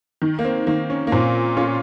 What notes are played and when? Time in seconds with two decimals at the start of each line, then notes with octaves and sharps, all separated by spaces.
0.22 D#3
0.39 A#3
0.45 C4
0.67 D#3 A#3
0.90 C#4
1.07 A#3
1.12 A#2 C4
1.57 C#4 F4